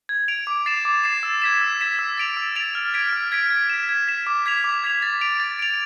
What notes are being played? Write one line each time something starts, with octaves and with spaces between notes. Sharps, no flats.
G#6
D7 F7
D6
A6 C7 E7
D6
A6 C7 E7
E6
G#6 B6 E7
E6
G#6 B6 E7
E6
A6 D7 F7
E6
A6 D7 F7
F6
G#6 B6 D7
F6
G#6 B6 D7
G#6
B6 E7
G#6
B6 E7
D6
G#6 B6 F7
D6
G#6 B6 F7
A6
D7 F7
A6
D7 F7